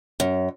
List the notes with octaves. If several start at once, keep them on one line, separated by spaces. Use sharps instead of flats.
F#2